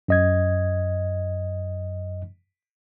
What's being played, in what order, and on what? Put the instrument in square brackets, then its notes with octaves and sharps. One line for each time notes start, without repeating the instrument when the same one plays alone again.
[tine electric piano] F#2 D#5 G#6